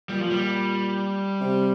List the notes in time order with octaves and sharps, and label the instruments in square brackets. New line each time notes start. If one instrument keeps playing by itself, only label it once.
[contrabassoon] A#2 [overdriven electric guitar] G3
[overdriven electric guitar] F3
G3
[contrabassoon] C3